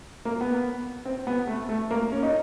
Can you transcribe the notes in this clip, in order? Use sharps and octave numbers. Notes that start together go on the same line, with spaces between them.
A#3
B3
C4
B3
A3
A3
A#3
C#4
D#4